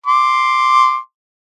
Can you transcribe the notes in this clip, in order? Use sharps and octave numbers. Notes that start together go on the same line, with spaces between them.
C6 D6